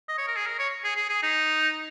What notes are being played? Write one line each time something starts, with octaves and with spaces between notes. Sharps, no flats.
D#5
C#5
A#4
G#4
A#4
C#5
G#4
G#4
G#4
D#4